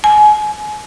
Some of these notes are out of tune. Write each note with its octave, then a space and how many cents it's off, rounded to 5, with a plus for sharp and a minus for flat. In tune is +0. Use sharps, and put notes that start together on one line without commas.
G#5 +30